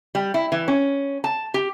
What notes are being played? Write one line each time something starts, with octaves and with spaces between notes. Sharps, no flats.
G3
E4
E3
C#4
A5
G4